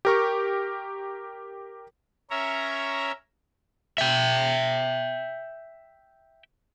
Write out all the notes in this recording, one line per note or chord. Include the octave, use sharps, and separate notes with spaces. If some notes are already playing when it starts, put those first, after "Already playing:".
G4 A#4 C#6
C#4 A#4 C#5 E5 A#5
E5 G5